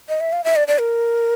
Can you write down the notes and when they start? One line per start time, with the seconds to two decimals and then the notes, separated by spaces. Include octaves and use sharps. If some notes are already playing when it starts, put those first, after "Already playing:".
0.09 D#5
0.20 E5
0.32 F5
0.44 E5
0.56 D5
0.68 D5
0.80 A#4